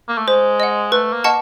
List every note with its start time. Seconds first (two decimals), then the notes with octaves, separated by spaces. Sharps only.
0.09 A#3
0.18 A3
0.28 G#3 C5
0.60 D#5 F#5
0.92 A3 B4
1.13 A#3
1.24 D#5 F#5 A5 C#6